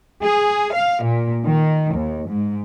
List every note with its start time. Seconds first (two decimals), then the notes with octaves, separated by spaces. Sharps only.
0.22 G#4
0.73 F5
1.03 A#2
1.44 D#3
1.95 D#2
2.29 G#2